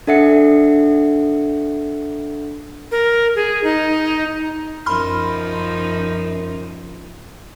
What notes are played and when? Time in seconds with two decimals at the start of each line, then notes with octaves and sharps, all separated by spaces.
0.07 D4 A4 E5 F#5 C#7
2.91 A#4
3.36 G#4
3.64 D#4
4.86 F#2 F3 D#4 B5 C6 F6